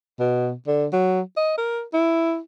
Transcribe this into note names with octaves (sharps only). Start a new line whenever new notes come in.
B2
D3
F#3
D#5
A#4
E4